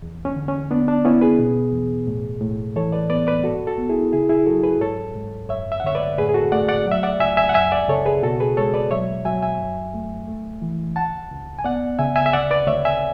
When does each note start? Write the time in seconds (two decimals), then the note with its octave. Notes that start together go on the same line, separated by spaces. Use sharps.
0.02 E2
0.25 C#4
0.36 D3
0.48 C#4
0.71 B3 D4
0.88 D4
1.05 B3 C#4 E4
1.21 G#4 B4
1.39 B2
1.73 E2
2.07 A2
2.41 A2
2.76 E3 A4 C#5
2.92 B4 D5
3.10 B3 B4 D5
3.27 B4 D5
3.44 G#2 F#4 A4
3.67 F#4 A4
3.78 B3
3.89 E4 G#4
4.12 C#3 E4 G#4
4.29 E4 G#4
4.46 F#3 F#4 A4
4.63 G#4 B4
4.81 G#2 A4 C#5
5.15 G#2
5.49 F#2 C#5 E5
5.72 E5
5.80 F#5
5.84 D3 C#5 E5
5.95 B4 D5
6.18 A2 G#4 B4
6.29 G#4
6.34 F#4 A4
6.52 A3 D5 F#5
6.68 D5 F#5
6.86 F#3
6.91 E5
7.03 D5 F#5
7.20 C#2 E5 G#5
7.37 E5 G#5
7.49 F#5
7.54 F#2 E5 G#5
7.72 D5 F#5
7.88 C#3 A4 C#5
8.05 G#4 B4
8.22 B2 F#4 A4
8.40 G#4 B4
8.57 G#3 A4 C#5
8.74 B4 D5
8.91 F#3 C#5 E5
9.25 F#3 E5 G#5
9.42 E5 G#5
9.59 F#2
9.94 A3
10.28 A3
10.62 E3
10.96 C#2 F#5 A5
11.31 C#2
11.59 G#5
11.64 B3 D5 F#5
11.99 C#3 E5 G#5
12.16 E5 G#5
12.26 E5
12.33 D2 D5 F#5
12.51 B4 D5
12.67 D2 C#5 E5
12.85 E5 G#5